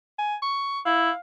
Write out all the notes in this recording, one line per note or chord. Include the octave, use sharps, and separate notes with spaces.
G#5
C#6
E4 F5